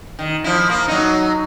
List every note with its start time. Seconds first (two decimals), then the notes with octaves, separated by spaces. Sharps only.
0.19 D#3
0.44 F3 E4
0.70 A#3
0.88 F#3 D#4